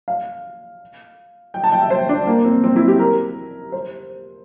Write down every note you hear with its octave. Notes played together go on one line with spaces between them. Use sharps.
F5
G5
A5
G5
E5
C5
D4
A#3
C4
C4
E4
G4
A#4
C5